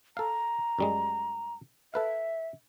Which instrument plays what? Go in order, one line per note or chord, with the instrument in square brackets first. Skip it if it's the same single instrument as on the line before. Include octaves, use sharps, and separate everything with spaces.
[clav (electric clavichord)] A4 F5 [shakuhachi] A#5
[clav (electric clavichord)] F#2 G3 G#3
[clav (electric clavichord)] A4 B4 F5 [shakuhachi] E5